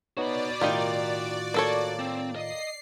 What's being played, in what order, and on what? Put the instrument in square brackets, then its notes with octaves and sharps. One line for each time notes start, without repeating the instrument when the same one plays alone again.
[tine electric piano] B3 D#4 C#5 [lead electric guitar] F#4 B5 [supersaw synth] D5
[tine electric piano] A2 D#3 F4 [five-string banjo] D#4 G4 A#4
[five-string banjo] A#3 A4 C#5
[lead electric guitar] C4
[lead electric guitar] D#5 [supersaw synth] C7